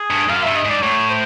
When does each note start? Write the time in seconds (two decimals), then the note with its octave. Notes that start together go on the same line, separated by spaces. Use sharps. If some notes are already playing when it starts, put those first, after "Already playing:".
Already playing: G#4
0.10 G2
0.29 F#2 F5
0.43 G2 E5
0.56 D#5
0.65 G#2 D5
0.82 A2 C#5
1.10 C5